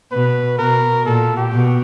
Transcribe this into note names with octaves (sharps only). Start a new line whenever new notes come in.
B2 B4
B2 A#4
A#2 A4
G4
B2